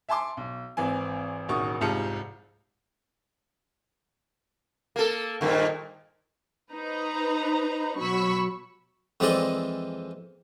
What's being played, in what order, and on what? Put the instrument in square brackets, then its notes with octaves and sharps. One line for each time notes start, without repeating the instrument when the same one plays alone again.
[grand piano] E5 G#5 A5 C6 D6
B1
G#1 E3 C4 G#5
E1 A1 D#3 F#4 C#6 D#6
F1 C2 G#2 F4 A5 C#7
[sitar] A#3 A4
G2 A#2 D#3
[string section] D#4 B4 C5 A#5
B2 F#3 B5 C#6 E6 B6
[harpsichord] F2 E3 G#3 C4 D5 D#5